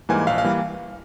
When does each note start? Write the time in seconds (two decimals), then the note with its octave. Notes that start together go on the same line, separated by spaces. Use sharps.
0.09 G#2 E3 G3 A#3 G#5
0.27 A#1 F5
0.38 F5
0.44 E3 G3 A#3